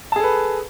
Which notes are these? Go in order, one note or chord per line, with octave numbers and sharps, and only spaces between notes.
G#4 A4 B4 A5